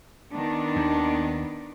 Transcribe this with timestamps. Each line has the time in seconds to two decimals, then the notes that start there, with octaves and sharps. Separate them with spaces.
0.33 D#3 B3 D4
0.76 D#2